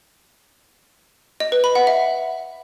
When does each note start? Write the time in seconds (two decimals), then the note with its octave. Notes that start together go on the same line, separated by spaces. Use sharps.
1.40 D#5
1.52 B4
1.64 B5
1.75 F#5
1.87 E5